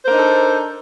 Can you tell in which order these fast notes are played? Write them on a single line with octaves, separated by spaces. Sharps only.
C5 A#4 D4 D#4 A4